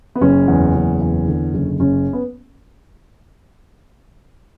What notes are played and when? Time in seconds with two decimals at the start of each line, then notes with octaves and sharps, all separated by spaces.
0.15 B3
0.21 F#1 C#4
0.48 E2
0.75 F#1
1.01 E2
1.28 D3
1.54 F#1
1.80 F#1 C#4
2.13 B3